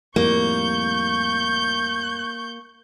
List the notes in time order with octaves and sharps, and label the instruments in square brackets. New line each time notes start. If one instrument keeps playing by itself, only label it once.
[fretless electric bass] F2 A2 G3 [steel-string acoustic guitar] A#3 [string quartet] C#6 G6